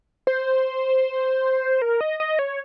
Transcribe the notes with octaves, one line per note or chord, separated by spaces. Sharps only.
C5
A#4
D#5
D#5
C#5